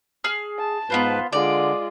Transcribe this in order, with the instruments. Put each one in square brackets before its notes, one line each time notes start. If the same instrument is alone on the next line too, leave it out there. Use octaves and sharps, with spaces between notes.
[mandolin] G#4 F6
[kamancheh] A5
[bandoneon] G#2 B4 [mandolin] B3 F4 C5
[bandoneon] D3 [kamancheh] G#3 F4 [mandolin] D5